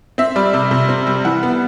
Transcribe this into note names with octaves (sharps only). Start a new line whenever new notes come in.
C4 E5
G3 D5
C3 E5
C3
C4
G3
E3 F#5
B3